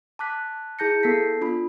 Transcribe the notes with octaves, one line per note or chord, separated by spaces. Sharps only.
A5 D6 F#6 B6
E4 G#4 A5 G6 A#6 C#7
B3 A4 A5 B6 C7
D4 F4 B5